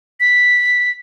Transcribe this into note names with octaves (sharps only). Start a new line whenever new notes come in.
B6